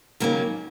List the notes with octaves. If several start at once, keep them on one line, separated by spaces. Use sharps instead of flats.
D#2 C#3 F#3 A#3 C#4